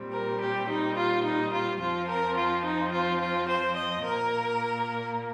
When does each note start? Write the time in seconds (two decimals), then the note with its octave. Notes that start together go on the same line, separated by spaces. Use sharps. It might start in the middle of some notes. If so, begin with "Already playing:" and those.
Already playing: A#2 G3 C4
0.12 A#4
0.40 G4
0.69 D#4
0.97 F4
1.24 D#4
1.53 F4
1.80 F2 F3 C4 F4
2.08 A#4
2.37 F4
2.65 D#4
2.92 F4
3.21 F4
3.48 C5
3.76 D#5
4.05 A#2 A#3 A#4